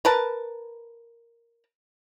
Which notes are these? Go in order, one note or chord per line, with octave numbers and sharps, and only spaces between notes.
A#4 B4 A5